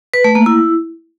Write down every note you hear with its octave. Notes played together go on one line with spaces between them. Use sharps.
B4
A3
A#3
E4